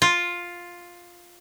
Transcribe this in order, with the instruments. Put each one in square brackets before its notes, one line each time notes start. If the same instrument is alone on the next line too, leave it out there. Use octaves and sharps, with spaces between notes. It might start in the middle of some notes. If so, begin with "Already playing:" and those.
[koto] F4